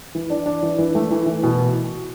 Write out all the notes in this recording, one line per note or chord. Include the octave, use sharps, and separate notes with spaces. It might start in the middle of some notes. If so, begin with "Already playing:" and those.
E3
D4
D4
E3
E3
A3
E3
E3
B2